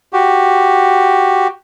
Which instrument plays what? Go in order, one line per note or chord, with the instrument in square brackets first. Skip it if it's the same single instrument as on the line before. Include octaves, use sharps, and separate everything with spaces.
[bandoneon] F#4 G4